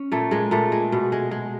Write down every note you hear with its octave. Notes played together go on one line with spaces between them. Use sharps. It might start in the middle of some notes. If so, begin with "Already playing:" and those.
Already playing: C#4
A#2 A3
A#2 G#3
A#2 A3
G#3
B2
G#3
G#3